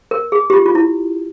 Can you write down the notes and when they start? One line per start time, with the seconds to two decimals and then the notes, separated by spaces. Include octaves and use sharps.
0.11 A#4
0.32 G#4
0.50 G4
0.53 F4
0.66 F4
0.75 E4